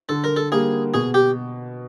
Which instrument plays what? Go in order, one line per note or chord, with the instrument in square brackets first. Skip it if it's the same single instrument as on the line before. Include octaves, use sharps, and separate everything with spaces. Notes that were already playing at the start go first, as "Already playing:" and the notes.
[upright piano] D3 [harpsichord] A4
[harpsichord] A#4
A4
[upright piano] G3 A#3 [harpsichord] G#4
[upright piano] B2 [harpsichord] G#4
[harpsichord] G4